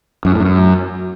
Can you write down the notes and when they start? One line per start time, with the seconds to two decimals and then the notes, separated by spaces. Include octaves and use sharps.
0.25 F#2
0.32 A2
0.40 F#2